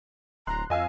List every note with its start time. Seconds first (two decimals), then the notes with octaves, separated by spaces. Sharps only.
0.47 D1 A#5 C6 F#6
0.70 F2 D#5 F5 G#5 E6